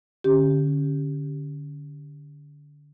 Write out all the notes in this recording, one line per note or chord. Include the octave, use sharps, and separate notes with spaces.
D3 C#4 G4